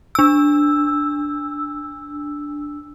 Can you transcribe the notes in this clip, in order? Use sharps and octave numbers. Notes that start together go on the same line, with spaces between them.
D4 E6